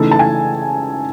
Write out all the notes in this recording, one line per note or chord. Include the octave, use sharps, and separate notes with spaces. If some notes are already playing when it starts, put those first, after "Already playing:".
Already playing: C#3 E3 A3 D#4 A4
A5
G#5